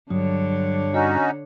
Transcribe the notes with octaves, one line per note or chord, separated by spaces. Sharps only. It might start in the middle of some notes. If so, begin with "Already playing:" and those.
G2 D3 F#3 D4 C#5
C#4 D#4 F#4 D#5